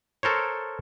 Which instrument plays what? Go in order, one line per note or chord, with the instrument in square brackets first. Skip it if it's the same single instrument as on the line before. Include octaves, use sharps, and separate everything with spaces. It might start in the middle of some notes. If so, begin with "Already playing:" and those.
[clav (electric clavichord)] A4 A#4 C5 C#5